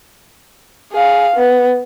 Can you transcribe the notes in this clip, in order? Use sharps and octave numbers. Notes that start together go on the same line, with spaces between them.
G#4 F5
B3